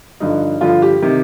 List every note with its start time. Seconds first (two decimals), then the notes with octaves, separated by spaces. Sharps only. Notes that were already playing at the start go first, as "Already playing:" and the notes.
0.20 G2 D3 F3 D#4
0.61 G2 D3 F3 F4
0.82 G4
1.02 C3 D#3